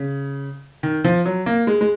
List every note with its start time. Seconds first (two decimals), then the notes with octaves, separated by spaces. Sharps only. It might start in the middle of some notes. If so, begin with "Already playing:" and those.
Already playing: C#3
0.83 D#3
1.04 F3
1.25 F#3
1.46 A#3
1.67 G#3
1.81 G#3